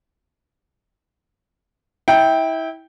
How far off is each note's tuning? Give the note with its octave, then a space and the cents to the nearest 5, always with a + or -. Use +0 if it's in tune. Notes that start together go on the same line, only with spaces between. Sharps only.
E4 -25 G5 +0